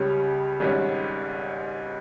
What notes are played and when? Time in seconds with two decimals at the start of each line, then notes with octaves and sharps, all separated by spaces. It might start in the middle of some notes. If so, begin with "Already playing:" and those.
Already playing: C#2 C#3 G3 C#4 G4
0.60 G#1 G#2 G3 C#4